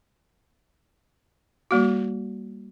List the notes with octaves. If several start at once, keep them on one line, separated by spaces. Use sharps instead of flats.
G3 A#3 F#4